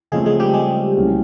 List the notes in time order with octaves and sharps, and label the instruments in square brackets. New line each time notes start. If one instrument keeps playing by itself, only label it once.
[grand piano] C#3 F3 A3 C4 [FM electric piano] G#3 G#4
[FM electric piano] G#3 G#4
G3 G4
G#3 G#4
[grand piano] C2 A#2 F#3 A3 C#4